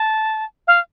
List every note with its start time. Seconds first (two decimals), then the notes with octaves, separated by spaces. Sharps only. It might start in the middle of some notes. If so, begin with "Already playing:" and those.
Already playing: A5
0.67 F5